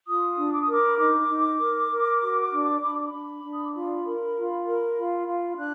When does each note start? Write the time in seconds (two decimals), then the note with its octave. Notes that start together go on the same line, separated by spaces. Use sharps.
0.07 F4 D#6
0.36 D4
0.52 D6
0.61 D#6
0.68 A#4 D6
0.87 B5
0.98 D#4 D6
1.29 D#4
1.59 A#4
1.90 A#4
2.20 F#4
2.50 D4
2.82 D4 B5
2.93 D6
3.05 B5
3.12 D4
3.43 D4
3.52 D#6
3.63 D6
3.73 F4 B5
4.04 A#4
4.35 F4
4.66 A#4
4.96 F4
5.27 F4
5.57 D4 F#6